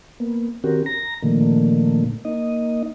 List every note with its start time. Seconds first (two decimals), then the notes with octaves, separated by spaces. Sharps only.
0.20 A#3 B3
0.64 D#3 C4 C#4 F#4 G4 A#4
0.86 A#5 A#6
1.23 A#2 D3 D#3 F3 A3 A#3
2.25 A#3 D#4 D#5